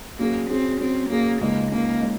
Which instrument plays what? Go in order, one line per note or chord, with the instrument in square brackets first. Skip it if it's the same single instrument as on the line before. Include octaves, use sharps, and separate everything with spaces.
[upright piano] F#3 C#4 G#4 [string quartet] A#3
[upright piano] F#3 C#4 G#4 [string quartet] C4
[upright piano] F#3 C#4 G#4 [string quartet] C4
[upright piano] F#3 C#4 G#4 [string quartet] A#3
[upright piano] C#2 C#3 G#3 D#4 [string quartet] A#3
[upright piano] C#2 C#3 G#3 D#4 [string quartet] A#3
[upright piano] C#3 G#3 D#4